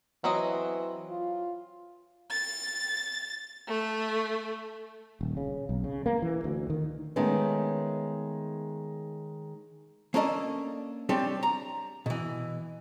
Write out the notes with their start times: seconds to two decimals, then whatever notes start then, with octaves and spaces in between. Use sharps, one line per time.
0.24 E3 F#3 C4 D#5
1.10 F4
2.31 A6
3.68 A3
5.21 D#1
5.37 C#3
5.69 B1
5.84 C#3
6.06 A#3
6.22 E3
6.44 D2
6.70 D#3
7.16 D#3 G#3 A3 B3 C#4
10.14 A#3 C#4 D4 A4 D5 D#5
11.09 G3 C4 D4 G4 C#5
11.43 A#5
12.06 B2 E3